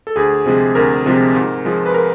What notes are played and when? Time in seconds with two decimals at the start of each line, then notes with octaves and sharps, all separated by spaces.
0.07 A4
0.16 D2 G#4
0.46 C3 F3 G#3
0.75 D2 A#4
1.06 C3 F3 G#3
1.35 G#2
1.65 F3 G#3
1.86 B4
1.94 A#4